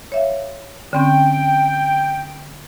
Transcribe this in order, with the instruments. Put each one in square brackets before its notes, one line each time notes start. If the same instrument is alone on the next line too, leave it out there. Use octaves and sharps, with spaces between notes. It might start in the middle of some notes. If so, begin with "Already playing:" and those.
[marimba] C#5 E5 F5
[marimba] D3 C4 C#4 [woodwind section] G5